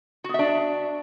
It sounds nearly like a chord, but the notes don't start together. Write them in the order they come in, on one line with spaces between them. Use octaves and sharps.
F#4 B3 E5 D4